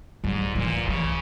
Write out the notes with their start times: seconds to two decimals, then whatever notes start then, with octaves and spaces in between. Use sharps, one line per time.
0.24 G#2 G3
0.55 A#2 E3
0.88 C#3 E3